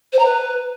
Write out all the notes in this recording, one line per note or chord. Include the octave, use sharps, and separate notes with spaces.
C5
A#5
B4